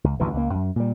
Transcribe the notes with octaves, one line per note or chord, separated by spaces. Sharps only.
C#2
A1 D2 G2 E3
C#2 A#3
F#2
A#2 G3